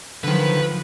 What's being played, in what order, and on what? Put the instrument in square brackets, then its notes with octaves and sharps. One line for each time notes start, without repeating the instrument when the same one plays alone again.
[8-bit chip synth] D3 D#3 [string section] F3 F#3 [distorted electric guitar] B4